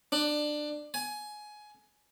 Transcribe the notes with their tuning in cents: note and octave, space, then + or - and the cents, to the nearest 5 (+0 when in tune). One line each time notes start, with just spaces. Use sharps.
D4 +20
G#5 +15